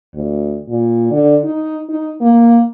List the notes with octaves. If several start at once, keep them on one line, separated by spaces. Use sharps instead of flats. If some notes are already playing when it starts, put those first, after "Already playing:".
D2
A#2
D3
D#4
D#4
A#3